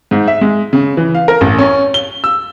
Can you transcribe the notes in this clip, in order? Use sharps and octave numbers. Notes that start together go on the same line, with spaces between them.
G#2
E5
G#3
C#3
E3
F5
A#4
A1
C#4
G7
E6